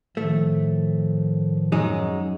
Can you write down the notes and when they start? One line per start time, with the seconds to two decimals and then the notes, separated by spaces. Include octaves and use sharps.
0.17 A2 D#3 F3 A3
1.72 F#2 G#3 D#4